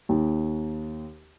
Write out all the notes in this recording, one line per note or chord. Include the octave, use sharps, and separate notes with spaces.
D#2